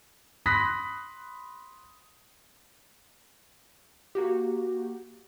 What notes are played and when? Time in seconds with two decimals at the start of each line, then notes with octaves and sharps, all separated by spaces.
0.46 B5 C6 D#6 F#6 A#6 B6
4.15 A#3 F#4 G4